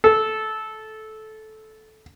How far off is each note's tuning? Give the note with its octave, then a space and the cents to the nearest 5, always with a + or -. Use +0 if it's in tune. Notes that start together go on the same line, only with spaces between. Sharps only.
A4 -15